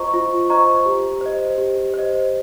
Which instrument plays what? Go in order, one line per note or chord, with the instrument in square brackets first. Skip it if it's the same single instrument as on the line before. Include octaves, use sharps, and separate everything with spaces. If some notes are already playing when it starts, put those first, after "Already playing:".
Already playing: [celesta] F4 C5 D#5 A#5 C#6
F4
C5 D#5 A#5 C#6
G4
C5 D#5
G4
C5 D#5